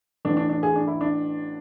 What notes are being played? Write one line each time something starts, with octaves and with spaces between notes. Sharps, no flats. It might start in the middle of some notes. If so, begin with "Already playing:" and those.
A1 A2 E3 D4
D4
D4
G#4
D4
E4
D4